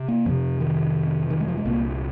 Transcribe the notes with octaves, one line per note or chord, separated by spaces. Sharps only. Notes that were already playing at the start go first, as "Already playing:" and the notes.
Already playing: C3
A#3
F2 C3 F3
D#3
D#3
G#3
F3
G#3
C2 A#2 A#3